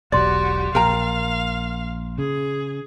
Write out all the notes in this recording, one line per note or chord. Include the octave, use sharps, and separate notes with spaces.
E1 B1 F#4 G4 D5 C6 A6
A#1 A#4 F5 G5 A#5
C#3 G#4